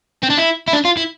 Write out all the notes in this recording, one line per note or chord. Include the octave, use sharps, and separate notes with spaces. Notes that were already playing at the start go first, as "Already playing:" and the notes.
C4
D4
E4
E4
D4
F4
E4